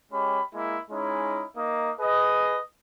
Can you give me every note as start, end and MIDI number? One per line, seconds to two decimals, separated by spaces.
0.12 0.40 56
0.12 0.40 61
0.12 0.40 67
0.12 0.40 83
0.54 0.78 56
0.54 0.78 58
0.54 0.78 64
0.91 1.44 56
0.91 1.44 61
0.91 1.44 63
0.91 1.44 64
1.57 1.91 58
1.57 1.91 63
1.57 1.91 75
2.00 2.60 68
2.00 2.60 71
2.00 2.60 75